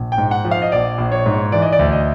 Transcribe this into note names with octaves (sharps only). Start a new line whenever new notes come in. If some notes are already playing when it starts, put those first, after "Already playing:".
Already playing: A#1
G5
G#2
F#5
F3
F5
D#5
A#1 D5
A#1
C#5
G#2
E3 D5
D#5
D5
D2
D#5